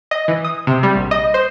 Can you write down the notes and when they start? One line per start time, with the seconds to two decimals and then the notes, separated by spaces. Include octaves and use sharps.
0.11 D#5
0.28 E3
0.44 D#6
0.67 C3
0.83 G3
0.96 A#1
1.11 D#5
1.34 C5